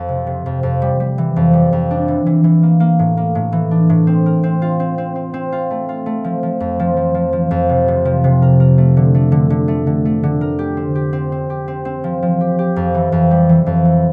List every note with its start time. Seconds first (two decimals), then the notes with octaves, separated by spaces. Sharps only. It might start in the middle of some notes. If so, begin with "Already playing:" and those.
Already playing: F2
0.09 C3
0.27 C3
0.46 F2
0.63 F2
0.82 G3
1.00 G3
1.18 E3
1.36 F2
1.53 G3
1.72 F2
1.91 D4
2.08 E3
2.26 E3
2.44 E3
2.63 A#3
2.80 A#3
2.99 A2
3.17 A#3
3.35 A2
3.52 E3
3.71 D4
3.89 A2
4.07 C4
4.26 A#4
4.43 C4
4.62 F4
4.80 C4
4.98 C4
5.16 C4
5.34 C4
5.52 F4
5.70 A3
5.89 F4
6.06 A3
6.24 F3
6.43 F3
6.60 F2
6.79 F3
6.97 F3
7.14 F3
7.33 F3
7.51 F2
7.69 C3
7.88 C3
8.05 F3
8.24 C3
8.42 A#4
8.60 A#4
8.78 A3
8.97 D3
9.15 A3
9.32 D3
9.50 D3
9.68 A3
9.87 D3
10.05 A3
10.23 D3
10.41 A#4
10.59 G4
10.77 C4
10.95 G4
11.13 C4
11.32 C4
11.50 G4
11.68 C4
11.85 C4
12.04 F3
12.22 F3
12.41 G4
12.59 G4
12.76 F2
12.94 E3
13.12 F2
13.31 G3
13.49 E3
13.66 F2
13.85 E3